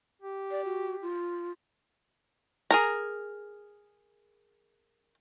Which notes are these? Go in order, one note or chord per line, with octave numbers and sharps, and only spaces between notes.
G4
D5
F#4
F4
G#4 A#4 A#5